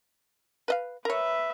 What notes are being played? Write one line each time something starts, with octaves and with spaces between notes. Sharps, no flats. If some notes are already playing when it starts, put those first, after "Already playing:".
B4 D#5 F5
A#4 B4 C#5 E5